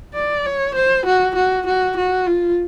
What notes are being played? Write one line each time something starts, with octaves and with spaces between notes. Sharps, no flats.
D5
C#5
C5
F#4
F#4
F#4
F#4
F4